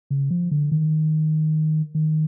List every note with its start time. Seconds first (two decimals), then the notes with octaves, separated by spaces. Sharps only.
0.10 C#3
0.31 F3
0.51 D3
0.72 D#3
1.95 D#3